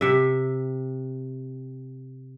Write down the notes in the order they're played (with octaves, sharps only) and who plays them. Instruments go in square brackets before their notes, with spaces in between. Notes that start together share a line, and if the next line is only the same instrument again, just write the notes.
[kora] C3 E5